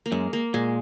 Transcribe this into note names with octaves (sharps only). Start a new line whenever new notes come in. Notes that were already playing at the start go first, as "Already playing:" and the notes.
A#3
F#2 G#3
A#3
A#2 G#3